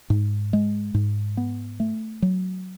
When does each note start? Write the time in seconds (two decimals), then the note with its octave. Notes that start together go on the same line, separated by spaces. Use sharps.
0.10 G#2
0.53 G#3
0.94 G#2
1.37 B3
1.80 A3
2.22 F#3